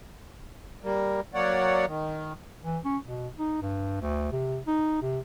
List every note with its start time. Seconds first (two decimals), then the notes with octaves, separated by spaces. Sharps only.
0.83 G3 A#3
1.34 F#3 A#3 C#5 D5 F#5
1.86 D#3
2.64 E3
2.85 C#4
3.04 B2
3.38 D#4
3.61 G2
4.01 D2
4.32 C3
4.67 D#4
5.02 C3